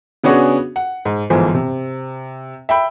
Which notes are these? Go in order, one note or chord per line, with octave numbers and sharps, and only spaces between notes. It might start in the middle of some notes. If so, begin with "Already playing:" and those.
C#3 B3 C#4 D4 F#4 G#4
F#5
G#2
G1 G#2 E3 F3
C3
E5 G5 B5